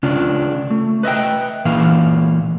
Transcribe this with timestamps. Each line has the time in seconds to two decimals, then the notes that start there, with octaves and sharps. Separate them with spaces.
0.03 C#3 C#4 D4 F4
0.71 A3
1.03 B4 D#5 E5 G5
1.65 A#2 E3 A#3 F5